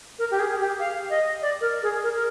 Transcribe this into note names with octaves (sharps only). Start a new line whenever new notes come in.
A#4
G4
G#4
G4
F5
D#5
D5
A#4
G#4
A#4
A#4